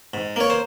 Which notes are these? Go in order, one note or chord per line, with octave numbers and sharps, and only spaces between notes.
G#2
A#3 C#5
C5